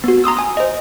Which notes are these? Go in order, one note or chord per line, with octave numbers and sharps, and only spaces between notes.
B3 F#4
A#5 C6 D#6 E6
G#5 D#6
C5 D#5